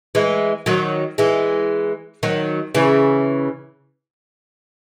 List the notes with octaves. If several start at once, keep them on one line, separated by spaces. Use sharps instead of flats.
E3 G#3
D#3 F#3
E3 G#3
D#3 F#3
C#3 E3